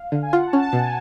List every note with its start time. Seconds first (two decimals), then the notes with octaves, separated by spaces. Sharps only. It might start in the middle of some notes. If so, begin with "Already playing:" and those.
Already playing: F5
0.12 D3
0.22 G#5
0.33 F4 F#5
0.47 A5
0.53 C#4
0.62 A5
0.73 B2
0.78 G#5